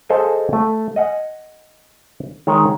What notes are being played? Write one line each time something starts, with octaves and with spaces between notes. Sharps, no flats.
G#4 A4 C5 D#5 F5 G#5
A3
D#5 F#5 G#5
D#3 G#3 C#5